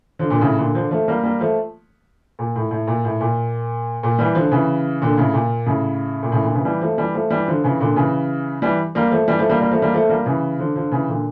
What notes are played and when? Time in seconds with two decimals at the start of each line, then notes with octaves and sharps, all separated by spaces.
0.19 D3 F3
0.30 A#2 D3
0.41 A2 C#3
0.58 A#2 D3
0.75 D3 F3
0.91 F3 A3
1.08 G3 A#3
1.23 G3 A#3
1.40 F3 A3
2.39 A#2
2.56 A2
2.71 A2
2.87 A#2
3.05 A2
3.21 A#2
4.03 A#2
4.19 E3 G3
4.35 D3 F3
4.51 C#3 E3
5.01 A#2 D3
5.17 A2 C#3
5.34 A#2
5.66 A2 C#3
6.23 A#2
6.32 A2 C#3
6.43 A#2 D3
6.54 C#3 E3
6.65 E3 G3
6.81 F3 A3
6.98 E3 G3
7.14 F3 A3
7.30 E3 G3
7.48 D3 F3
7.64 C#3 E3
7.80 A#2 D3
7.96 C#3 E3
8.62 E3 G3
8.95 G3 A#3
9.11 F3 A3
9.28 E3 G3
9.39 F3 A3
9.49 G3 A#3
9.60 G3 A#3
9.71 F3 A3
9.82 G3 A#3
9.94 F3 A3
10.09 G3 A#3
10.26 C#3 E3
10.59 D3 F3
10.76 D3 F3
10.92 C#3 E3
11.08 A#2 D3